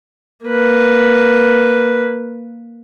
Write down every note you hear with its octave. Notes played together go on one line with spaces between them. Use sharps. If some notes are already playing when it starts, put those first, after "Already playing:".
A#3 B4